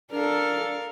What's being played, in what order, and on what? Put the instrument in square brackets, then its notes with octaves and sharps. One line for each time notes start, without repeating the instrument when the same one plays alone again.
[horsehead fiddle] D4 A4 [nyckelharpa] A#4 F5